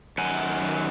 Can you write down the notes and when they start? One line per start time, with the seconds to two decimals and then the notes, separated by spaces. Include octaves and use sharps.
0.18 F#2 D#3 F#5 G#5